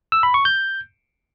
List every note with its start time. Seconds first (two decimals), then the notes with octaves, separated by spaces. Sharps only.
0.12 E6
0.23 B5
0.34 C#6
0.45 G6